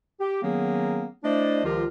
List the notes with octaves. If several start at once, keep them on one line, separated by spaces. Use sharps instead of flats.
G4
D#3 F#3 A#3 B3 C#4 G#4
A3 D4 E4 C5 D5 D#5
C#2 D#3 F3 F4 G4 A#4